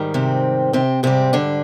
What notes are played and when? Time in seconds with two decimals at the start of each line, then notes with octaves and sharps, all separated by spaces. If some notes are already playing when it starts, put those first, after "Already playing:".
Already playing: G#2 D#3 G3
0.14 C3 C4
0.73 C3 C4
1.03 G#2 C3 G3 C4
1.33 D3 D4